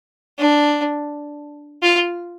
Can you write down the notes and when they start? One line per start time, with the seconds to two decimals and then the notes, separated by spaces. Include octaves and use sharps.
0.38 D4
1.82 F4